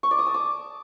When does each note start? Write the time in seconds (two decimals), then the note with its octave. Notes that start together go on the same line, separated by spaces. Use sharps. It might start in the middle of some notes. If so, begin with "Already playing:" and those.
0.03 C#6
0.11 D5
0.19 D#6
0.27 A5
0.34 D6